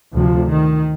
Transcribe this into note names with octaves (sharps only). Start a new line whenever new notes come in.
D2 C3 F3
D#3